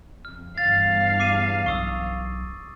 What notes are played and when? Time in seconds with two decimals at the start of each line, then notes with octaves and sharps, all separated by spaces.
0.25 F2 F6
0.58 E2 G2 F5 A6
1.20 D6 C7 D#7
1.66 B1 C#6 D#6 E6